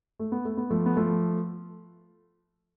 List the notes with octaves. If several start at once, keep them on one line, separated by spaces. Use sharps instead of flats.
A3
B3
A3
B3
F3 A3
B3
F3 A3